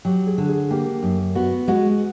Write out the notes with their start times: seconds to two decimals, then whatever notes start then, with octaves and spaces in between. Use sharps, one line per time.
0.05 F#3 G4
0.27 G#4
0.38 D3
0.48 G#4
0.71 A#3 G4
1.03 F#2
1.35 B3 F#4
1.68 G#3 F#4